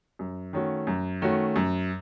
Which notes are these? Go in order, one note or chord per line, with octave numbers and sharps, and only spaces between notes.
F#2
D#3 A3 C#4 F#4
F#2
D#3 A3 C#4 F#4
F#2